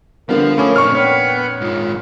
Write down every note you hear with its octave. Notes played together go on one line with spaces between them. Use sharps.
D3 F3 G3 B3 A#4
A3 C#4 B5 D6 D#6
F2 A#2 D#3 C4 D4 C#6 F6
B3 C#5 G5
G#2 D#3 F4